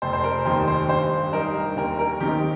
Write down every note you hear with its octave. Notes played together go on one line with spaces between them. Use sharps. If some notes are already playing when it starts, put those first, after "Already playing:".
F1 C5
C5
A#4
D#2 D#3 C5
C5
G2 C5
G3 D#4 A#4
D#2 A#4
A#4
D#3 C4 D#4 G4